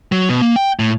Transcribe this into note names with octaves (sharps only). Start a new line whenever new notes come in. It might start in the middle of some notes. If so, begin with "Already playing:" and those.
F#3
B2
A#3
G5
A2